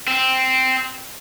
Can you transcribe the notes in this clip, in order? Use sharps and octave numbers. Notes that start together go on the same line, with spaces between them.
C4